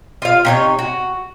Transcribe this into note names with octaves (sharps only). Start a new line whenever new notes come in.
F4 F5
C3 D#4 C#5
F#4